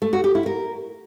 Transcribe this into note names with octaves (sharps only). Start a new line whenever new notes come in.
A3
F#4
G4
E4
A#4